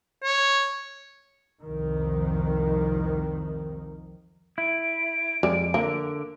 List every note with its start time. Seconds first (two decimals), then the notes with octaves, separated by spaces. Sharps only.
0.23 C#5
1.62 C2 F2 D#3
4.58 E4 D7
5.43 F2 G3 G#3
5.74 D3 A#3